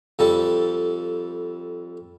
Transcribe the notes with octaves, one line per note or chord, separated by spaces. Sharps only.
F2 G3 A4